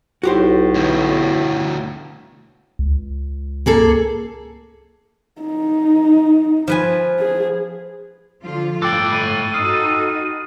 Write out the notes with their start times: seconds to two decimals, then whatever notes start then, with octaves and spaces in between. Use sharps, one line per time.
0.23 B1 A2 F#4 G4 C5
0.74 D2 B2
2.79 C#2
3.66 A#3 G#4 A4
5.41 D#4
6.68 F3 B4 G#5
7.19 G#4
8.42 D3 F3 F4
8.82 A2 A4 G5 D6 F#6 A6 F#7
9.12 B5 D#7
9.54 D#4 F#4 D#6 F6 C7